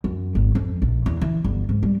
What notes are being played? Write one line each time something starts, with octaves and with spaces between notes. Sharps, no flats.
F#2
G#1
F2
A#1
E2
E3
G1
G#2
G3